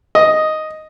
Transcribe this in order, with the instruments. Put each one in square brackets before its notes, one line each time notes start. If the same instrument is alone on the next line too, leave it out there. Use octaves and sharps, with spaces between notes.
[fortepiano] D#5